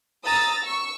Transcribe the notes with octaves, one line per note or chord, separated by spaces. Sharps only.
A#5 D#6 E6 A6
C#6 E6